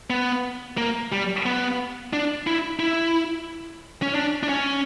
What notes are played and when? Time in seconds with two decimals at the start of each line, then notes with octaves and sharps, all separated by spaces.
0.10 B3
0.77 A#3
1.12 G3
1.46 B3
2.13 D4
2.47 E4
2.80 E4
4.02 C#4
4.15 D4
4.43 D4
4.49 C#4